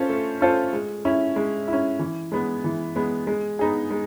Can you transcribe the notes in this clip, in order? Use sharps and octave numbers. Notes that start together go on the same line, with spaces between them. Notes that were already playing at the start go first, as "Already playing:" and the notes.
Already playing: C#4 F4 A4 C5
A3
C#4 F4 A4 C5
G#3
C#4 E4
G#3
C#4 E4
E3
G#3 B3
E3
G#3 B3
G#3
B3 D#4 G#4
G#3